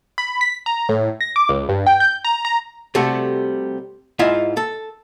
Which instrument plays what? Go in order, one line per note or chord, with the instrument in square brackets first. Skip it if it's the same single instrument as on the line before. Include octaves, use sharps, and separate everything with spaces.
[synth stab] B5
B6
A#5
A2
A#6
D6
C#2
G2
G5
G6
A#5
A#5
[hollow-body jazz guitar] C3 G3 A3 F#4 A4
G#2 E4 F4 D#5 E5 G#5
A4